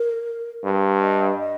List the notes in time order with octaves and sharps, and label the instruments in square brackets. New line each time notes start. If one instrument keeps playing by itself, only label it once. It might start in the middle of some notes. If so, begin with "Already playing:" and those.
Already playing: [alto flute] A#4
[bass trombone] G2
[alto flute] D#5
D#5